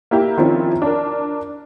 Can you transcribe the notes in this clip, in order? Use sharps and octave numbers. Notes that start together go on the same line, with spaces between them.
A#3 E4 G4
D#3 F3 C4 C#4 E4
D4 A#4